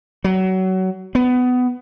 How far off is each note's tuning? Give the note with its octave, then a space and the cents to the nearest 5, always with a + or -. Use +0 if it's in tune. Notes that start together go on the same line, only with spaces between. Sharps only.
F#3 +25
B3 +20